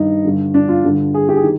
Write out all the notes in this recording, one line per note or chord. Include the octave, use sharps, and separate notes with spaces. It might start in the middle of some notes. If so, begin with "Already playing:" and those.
Already playing: G2 D#3 D#4
G2 D3
D4
F4
G2 D3
G#4
G4
G#4
D#3